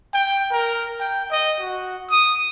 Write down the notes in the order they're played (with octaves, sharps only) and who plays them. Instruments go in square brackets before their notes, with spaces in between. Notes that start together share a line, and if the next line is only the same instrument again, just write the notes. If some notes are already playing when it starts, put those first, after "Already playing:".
[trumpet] G5
A#4
G5
D#5
F#4
D#6